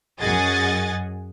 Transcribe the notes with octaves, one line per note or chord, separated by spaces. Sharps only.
F#2 G#4 D#5 F#5 G#5 A6